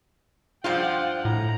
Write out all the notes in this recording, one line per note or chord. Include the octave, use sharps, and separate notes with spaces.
G2 F3 F4 F#5 G5
A2 A#5